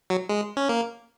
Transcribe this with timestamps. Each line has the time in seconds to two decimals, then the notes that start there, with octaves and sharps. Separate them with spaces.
0.10 F#3
0.29 G#3
0.57 C#4
0.69 A#3